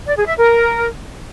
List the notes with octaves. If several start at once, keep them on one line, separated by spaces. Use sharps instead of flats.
D5
G#4
E5
A#4